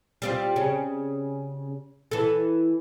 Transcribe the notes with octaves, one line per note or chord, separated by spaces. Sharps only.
G3 C4 F4
C#3 C#4
E3 A4